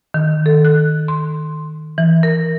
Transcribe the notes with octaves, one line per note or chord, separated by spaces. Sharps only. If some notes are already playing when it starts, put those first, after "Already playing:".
D#3
A4
F#6
C6
E3
A#4